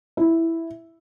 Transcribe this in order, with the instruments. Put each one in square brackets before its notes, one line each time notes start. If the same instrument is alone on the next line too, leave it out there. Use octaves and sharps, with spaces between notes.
[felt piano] E4